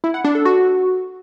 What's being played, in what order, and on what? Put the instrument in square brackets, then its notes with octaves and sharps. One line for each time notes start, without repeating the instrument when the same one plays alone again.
[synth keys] E4
F#5
D4
A4
F#4